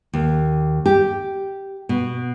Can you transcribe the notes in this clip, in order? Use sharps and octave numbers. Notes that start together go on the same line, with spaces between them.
D#2
G4
B2